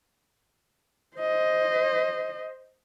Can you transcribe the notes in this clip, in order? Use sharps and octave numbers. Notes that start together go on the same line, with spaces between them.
C5 D#5